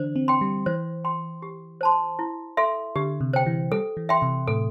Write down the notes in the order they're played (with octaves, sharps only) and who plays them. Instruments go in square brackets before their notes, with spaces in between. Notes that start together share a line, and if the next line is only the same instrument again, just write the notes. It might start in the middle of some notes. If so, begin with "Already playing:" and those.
Already playing: [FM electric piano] D3 E3 D4 [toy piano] C5
[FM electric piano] C4
[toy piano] G5 C6
[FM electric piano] G3
[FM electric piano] E3 [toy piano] C5
[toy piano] G5 C6
G4
C5 A5 C6
E4
A4 E5 C6
[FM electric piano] D3 [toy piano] G4
[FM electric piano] C3
[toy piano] C5 G5
[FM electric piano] E3
[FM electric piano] G3 [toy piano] A4
[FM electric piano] E3
[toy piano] E5 G5 C6
[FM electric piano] C3
[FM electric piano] A2 [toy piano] A4